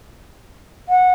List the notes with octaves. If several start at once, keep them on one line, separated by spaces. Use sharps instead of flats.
F#5